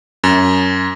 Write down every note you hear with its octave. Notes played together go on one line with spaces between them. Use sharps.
F#2